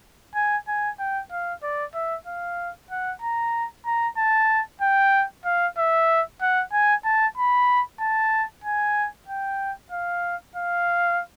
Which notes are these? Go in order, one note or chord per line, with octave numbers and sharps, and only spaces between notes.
G#5
G#5
G5
F5
D5
E5
F5
F#5
A#5
A#5
A5
G5
F5
E5
F#5
G#5
A5
B5
A5
G#5
G5
F5
F5